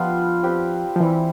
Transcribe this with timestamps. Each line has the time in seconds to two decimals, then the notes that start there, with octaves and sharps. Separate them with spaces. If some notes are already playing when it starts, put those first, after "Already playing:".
Already playing: F3 G3 B3 D4 F4 B4
0.43 C4 G4 B4
0.96 F3
1.00 E3 G3 C4 E4